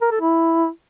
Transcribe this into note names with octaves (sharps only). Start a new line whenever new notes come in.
A#4
A4
E4